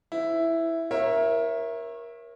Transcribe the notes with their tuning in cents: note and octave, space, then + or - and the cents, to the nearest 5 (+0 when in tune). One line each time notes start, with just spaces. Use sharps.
E4 +0 C5 -40
A#4 +20 C#5 -30 E5 +0